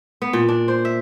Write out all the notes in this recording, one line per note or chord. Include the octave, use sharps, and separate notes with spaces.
B3
A#2
D4
C5
E5